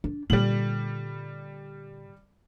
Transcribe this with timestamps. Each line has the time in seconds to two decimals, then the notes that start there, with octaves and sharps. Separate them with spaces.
0.04 D4
0.30 A#2 D3 G3 F#7